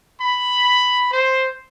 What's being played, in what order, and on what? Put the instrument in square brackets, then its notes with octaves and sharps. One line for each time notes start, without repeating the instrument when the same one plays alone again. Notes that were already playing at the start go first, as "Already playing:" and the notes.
[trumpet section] B5
C5